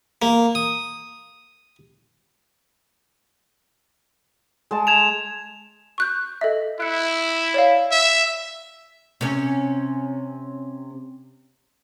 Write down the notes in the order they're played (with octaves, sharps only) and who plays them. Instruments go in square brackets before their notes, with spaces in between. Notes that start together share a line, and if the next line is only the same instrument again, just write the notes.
[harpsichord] A#3
D#6
[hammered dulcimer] G#3 A5
[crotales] G#6 E7 F7
[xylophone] C#6 F#6 G6
A4 D#5 E5
[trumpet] E4 [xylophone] F#6 C#7
[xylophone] C#5 D5 F5
[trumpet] E5
[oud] C3 C#4